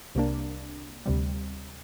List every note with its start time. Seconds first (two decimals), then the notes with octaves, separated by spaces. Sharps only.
0.15 C2 C3 A#3 D4
1.06 D2 C3 G3